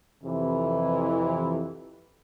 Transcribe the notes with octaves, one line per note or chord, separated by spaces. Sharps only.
F2 C3 E3